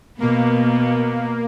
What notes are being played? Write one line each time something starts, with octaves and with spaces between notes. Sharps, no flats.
B2 A#3 B3